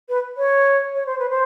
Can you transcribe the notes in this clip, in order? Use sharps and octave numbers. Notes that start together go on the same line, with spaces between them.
B4
C#5
C#5
C5
B4
C5